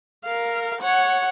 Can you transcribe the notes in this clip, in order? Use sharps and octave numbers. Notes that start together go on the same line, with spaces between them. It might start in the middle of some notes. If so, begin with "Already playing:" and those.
A#4 F5
C#5 F#5